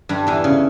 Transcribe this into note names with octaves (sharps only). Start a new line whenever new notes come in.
G2 G3
E2 E3
C#3